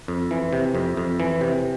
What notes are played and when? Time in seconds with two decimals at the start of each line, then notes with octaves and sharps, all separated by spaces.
0.08 F2
0.31 E3
0.53 C3
0.75 F2
0.97 F2
1.20 E3
1.41 C3